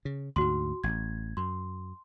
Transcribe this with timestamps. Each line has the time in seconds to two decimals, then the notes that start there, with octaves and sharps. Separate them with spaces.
0.05 C#3
0.36 D2 G#2 F#4 C6
0.84 A1 G#6
1.37 F#2 C6